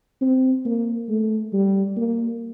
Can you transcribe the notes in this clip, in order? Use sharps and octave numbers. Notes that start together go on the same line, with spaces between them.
C4
A#3
A3
G3
A#3